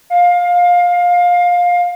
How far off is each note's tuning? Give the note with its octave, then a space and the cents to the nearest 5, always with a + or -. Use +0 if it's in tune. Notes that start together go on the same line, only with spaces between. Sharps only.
F5 +20